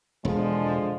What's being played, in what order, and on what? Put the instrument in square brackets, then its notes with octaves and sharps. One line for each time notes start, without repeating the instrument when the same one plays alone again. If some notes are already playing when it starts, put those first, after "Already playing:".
[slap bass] E1 [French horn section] D3 F3 G#3